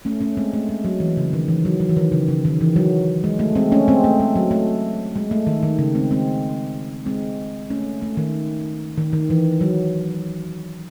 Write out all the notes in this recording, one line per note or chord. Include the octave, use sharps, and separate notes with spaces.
A3 C#4
A3 C#4
G#3 C4
A3
G#3
F#3
E3
C#3
D#3
E3
F#3
F#3
E3
D#3
C#3
C#3
D#3
E3
F#3
G#3
A3
G#3 C4
A3 C#4
G#3 C4
A3
G#3
F#3
A3
G#3
A3
D#3
D#3
C#3
G#3 C4
G#3 C4
G#3 C4
A3 C#4
A3
D#3
D#3
D#3
E3
F#3